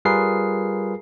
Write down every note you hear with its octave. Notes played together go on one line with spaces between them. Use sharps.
G3 F4 G#4 A#4 B4 C7